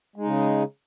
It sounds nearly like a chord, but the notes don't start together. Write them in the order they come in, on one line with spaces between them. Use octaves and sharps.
G#3 D#4 C#3